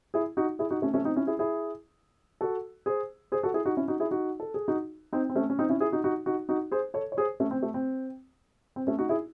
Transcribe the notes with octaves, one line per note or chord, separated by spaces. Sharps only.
E4 G#4
D#4 F#4
E4 G#4
D#4 F#4
A3 C#4
A3 C#4
C4 D#4
C#4 E4
E4 G#4
E4 G#4
F#4 A4
G#4 C5
G#4 C5
F#4 A4
E4 G#4
D#4 F#4
C#4 E4
D#4 F#4
E4 G#4
D#4 F#4
A4
G#4
D#4 F#4
C4 D#4
C4
A3 C#4
C#4
C4 D#4
C#4 E4
E4 G#4
D#4 F#4
D#4 F#4
D#4 F#4
D#4 F#4
G#4 C5
A4 C#5
C#5
G#4 C5
A3 C#4
C4
A3
C4
C4
A3 C#4
D#4 F#4
E4 G#4